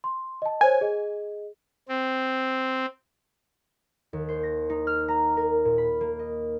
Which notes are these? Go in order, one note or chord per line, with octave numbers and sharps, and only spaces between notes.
C6
D#5 A5
A#4 C5 C#5 G#5
G#4 D#5
C4
D#2
C5
A#6
D#4
F6
A#5
A#4
A#2
B5
A#3
D#5